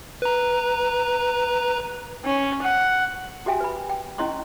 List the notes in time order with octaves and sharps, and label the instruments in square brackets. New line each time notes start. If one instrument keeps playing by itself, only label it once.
[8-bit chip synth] B4 A#5
[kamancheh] C#4
F#5
[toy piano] F#4 G4 E5 G5 G#5
B4 B5
G5
C#4 E4 D#5 C6 C#6